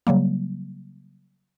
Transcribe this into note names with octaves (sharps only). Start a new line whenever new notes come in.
C#3 F#3 G3 A#3